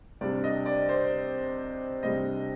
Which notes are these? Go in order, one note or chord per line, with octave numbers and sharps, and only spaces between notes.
C3 G3 D4 D5
D#5
D5
C5
C3 G3 D4 D#5